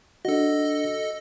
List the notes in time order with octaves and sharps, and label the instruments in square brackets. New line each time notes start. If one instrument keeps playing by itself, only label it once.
[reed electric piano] D4 F#4 [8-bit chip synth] A4 D#5